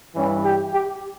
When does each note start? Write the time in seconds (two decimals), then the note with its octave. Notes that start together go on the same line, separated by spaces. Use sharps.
0.14 G2 E3 G3 C#4
0.44 G4
0.72 G4